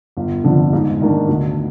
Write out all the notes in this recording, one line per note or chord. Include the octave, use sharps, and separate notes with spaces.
G1
F2 D3
G#2
D#3 A#3 D4
D2